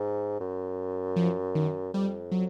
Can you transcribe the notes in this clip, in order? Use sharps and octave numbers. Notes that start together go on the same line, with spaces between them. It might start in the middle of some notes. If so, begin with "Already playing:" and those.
Already playing: G#2
F#2
F3
D#3
F2 G3
F#3